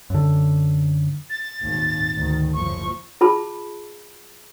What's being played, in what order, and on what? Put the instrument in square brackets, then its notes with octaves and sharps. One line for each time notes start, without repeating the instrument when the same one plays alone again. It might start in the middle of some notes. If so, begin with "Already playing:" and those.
[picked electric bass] F#2 D3
[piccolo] A6
[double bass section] G#1 D#2 A#2
D2 D#3
[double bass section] F#1 F3 [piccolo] C#6
[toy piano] F4 G#4 A5 B5